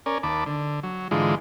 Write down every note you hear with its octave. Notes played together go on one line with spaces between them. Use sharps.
C#4 A#4 D5 G#5
D#2 A5 B5 D6
D3
F#3
G#2 D3 E3 G#3 F4